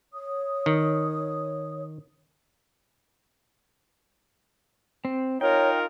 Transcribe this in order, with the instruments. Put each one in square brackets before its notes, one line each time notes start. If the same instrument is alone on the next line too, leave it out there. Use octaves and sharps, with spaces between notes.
[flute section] C#5 D#6
[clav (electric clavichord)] D#3
[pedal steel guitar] C4
[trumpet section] D#4 F4 A#4 [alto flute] C#5 [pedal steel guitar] G5